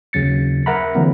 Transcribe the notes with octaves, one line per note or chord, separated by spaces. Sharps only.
D#2 C#3 F#3 A6 C#7
A#4 E5 F#5 A#5 B5
D3 E3 F#3 A#3 C4